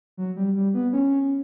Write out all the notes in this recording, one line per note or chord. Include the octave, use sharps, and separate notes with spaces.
F#3
G3
G3
B3
C#4